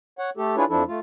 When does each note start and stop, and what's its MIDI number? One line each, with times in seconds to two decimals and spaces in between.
0.19 0.30 73
0.19 0.30 78
0.37 0.56 57
0.37 0.56 67
0.37 0.56 69
0.57 0.65 62
0.57 0.65 64
0.57 0.65 65
0.57 0.65 68
0.57 0.65 71
0.57 0.65 73
0.69 0.83 41
0.69 0.83 53
0.69 0.83 62
0.69 0.83 64
0.69 0.83 69
0.88 1.00 57
0.88 1.00 65